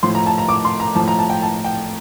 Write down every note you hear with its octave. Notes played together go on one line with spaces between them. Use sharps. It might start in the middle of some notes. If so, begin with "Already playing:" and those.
A2 F3 C6
A#5
A5
A#5
D6
C6
A#5
A2 F3 A5
A#5
A5
G5
A5
G5